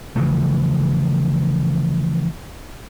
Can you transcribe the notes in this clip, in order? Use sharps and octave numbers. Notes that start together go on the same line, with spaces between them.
C#3 E3 F3 A3